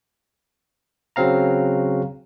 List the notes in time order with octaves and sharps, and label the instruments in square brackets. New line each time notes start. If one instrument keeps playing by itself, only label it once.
[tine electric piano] C#3 F#3 C4 F5 A#5